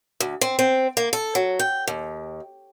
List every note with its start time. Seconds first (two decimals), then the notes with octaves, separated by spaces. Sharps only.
0.20 D2
0.41 C4
0.59 C4
0.97 A#3
1.13 A4
1.35 F#3
1.59 G5
1.88 D#2